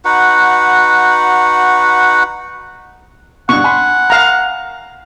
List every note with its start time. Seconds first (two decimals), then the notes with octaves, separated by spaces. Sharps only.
0.05 D#4 F#4 B4 F#5
3.49 G2 B2 F#5 C#6
3.64 G#5 B5 C6
4.10 F5 A#5